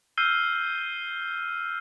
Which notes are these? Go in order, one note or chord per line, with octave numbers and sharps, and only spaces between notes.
E6 F6 G6 C7 D#7 G7